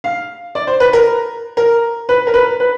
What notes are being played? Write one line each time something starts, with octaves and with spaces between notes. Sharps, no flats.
F5
D5
C5
B4
A#4
A#4
B4
A#4
B4
B4